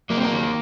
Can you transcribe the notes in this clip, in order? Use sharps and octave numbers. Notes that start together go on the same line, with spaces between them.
F#3 A#3
C4
A#3
D#3